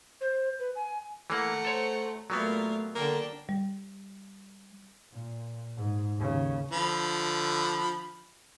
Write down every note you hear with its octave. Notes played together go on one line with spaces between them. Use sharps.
C5
B4
G#5
E3 A3 A#3 F#5 A#5
A4 C5 C#5
A#2 F#3 G3 A3 B3 A#4 F5
D3 A#3 D4 G5
G3
A#2
G#2
D#2 C#3
D3 F3 B5